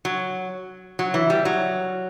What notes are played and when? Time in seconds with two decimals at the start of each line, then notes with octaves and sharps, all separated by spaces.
0.05 F#3
0.99 F#3
1.14 E3
1.30 G3
1.45 F#3